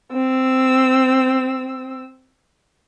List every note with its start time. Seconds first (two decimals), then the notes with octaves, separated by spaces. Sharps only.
0.13 C4 E6